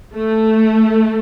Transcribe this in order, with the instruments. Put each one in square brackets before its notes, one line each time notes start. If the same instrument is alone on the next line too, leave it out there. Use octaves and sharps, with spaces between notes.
[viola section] A3